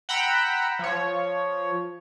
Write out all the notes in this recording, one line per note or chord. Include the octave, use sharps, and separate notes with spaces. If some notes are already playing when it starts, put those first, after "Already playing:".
F#5 G5 A#5 B5 E6
F3 C#5